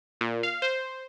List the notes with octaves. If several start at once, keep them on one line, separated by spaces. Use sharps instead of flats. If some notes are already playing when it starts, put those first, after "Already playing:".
A#2
F5
C5